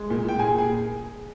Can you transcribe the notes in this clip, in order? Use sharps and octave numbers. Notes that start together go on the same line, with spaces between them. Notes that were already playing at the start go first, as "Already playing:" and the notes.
Already playing: G#3
A#2
G5
A#2 G#4 G#5
G#4 G#5